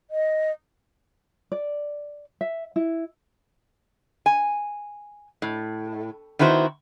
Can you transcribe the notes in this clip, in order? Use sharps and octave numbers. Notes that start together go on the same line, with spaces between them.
D#5
D5
E5
E4
G#5
A2
D#3 B3 E4 F#4 C5